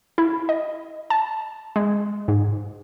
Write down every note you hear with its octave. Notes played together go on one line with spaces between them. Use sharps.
E4
D#5
A5
G#3
G#2